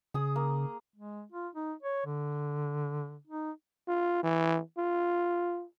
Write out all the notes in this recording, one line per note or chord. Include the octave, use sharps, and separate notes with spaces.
C#3 G#4 D#6
A#3
G#3
F4
D#4
C#5
D3
D#4
F4
E3
F4